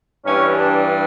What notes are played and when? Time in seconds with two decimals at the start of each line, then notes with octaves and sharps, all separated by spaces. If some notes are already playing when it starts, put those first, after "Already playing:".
0.25 G2 E3 G3 C#4
0.56 D4